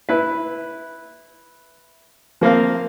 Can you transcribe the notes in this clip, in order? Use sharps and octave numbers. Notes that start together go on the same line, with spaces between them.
E4 B4
F3 A#3 C4 F5